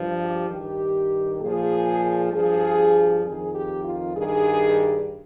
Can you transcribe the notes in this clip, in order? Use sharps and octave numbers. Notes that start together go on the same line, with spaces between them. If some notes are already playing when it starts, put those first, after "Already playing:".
Already playing: G2 F3
G4
G2 D#3 G4
A#2 F3 G#4
G2 F3 G#4
F2 D#3 G#4
G4
F4
G2 D#3 G#4